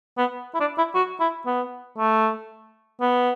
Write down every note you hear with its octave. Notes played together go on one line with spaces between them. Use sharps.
B3
E4
D4
E4
F#4
E4
B3
A3
B3